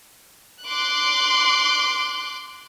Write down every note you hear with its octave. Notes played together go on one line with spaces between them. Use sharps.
C6 D6 F#6